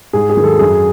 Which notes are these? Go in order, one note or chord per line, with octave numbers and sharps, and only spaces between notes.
G#2 G#4
G#4
D#3 F#3
A4
F#2 G#4